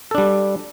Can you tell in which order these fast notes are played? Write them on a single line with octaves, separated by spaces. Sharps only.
A4 D4 G3